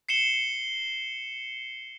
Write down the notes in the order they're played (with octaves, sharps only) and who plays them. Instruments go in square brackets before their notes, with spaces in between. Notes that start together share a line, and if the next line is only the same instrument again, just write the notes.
[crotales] C7 C#7 E7 G7